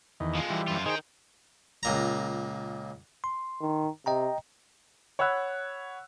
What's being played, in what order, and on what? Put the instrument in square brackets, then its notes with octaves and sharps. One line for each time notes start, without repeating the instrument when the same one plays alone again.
[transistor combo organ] E2 D#3
[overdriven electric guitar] F3 G#3
[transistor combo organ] E3 G3
[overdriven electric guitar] F#2 F4
[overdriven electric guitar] D#3 G5 [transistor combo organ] D#4 G#4 C5
[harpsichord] C#2 A#2 A#5
[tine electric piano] C6
[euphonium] D#3
[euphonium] C3 [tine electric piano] D#5 G5 A#5
[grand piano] C#5 F#5 B5 E6 F#6